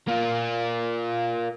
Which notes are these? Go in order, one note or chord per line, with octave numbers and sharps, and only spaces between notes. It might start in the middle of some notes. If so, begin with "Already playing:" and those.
A#3 F4